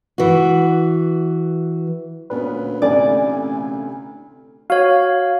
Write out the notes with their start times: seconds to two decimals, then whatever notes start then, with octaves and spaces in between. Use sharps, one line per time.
0.18 E3 F#4
2.30 D2 A#2 B3 C#4 B4
2.82 A1 D2 C3 D5 G#5
4.70 F#4 C#5 F5